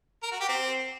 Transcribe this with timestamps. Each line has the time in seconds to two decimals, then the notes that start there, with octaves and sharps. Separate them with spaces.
0.23 A#4
0.31 F#4
0.40 G4
0.49 C4